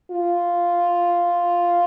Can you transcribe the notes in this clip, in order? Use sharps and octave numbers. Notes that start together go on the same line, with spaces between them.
F4